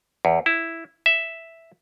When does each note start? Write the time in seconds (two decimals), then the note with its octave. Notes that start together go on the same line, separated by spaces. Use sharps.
0.25 E2
0.46 E4
1.06 E5